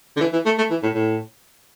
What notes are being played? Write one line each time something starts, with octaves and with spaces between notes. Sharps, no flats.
D3
E3
E3
A3
A3
E3
A2
A2